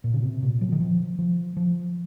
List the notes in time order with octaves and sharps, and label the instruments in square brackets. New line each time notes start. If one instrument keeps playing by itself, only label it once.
[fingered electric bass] A#2
C#3
C3
A#2
F#3
D#3
F3
F3
F3